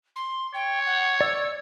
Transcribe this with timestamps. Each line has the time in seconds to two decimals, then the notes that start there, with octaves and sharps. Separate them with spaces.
0.16 C6
0.54 C#5 G5
0.86 F#5
1.21 D5 E6